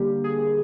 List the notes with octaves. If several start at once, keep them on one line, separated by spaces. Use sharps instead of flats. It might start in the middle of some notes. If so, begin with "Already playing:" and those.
Already playing: D3 G3 A#3 G4
G#4